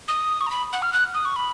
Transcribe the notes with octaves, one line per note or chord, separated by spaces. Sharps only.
D#6
C#6
A#5
B5
F#5
F6
F#6
D#6
C#6
B5